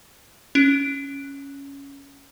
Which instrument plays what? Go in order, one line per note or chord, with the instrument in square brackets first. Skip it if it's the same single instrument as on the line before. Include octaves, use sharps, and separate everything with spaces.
[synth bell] C#4 D7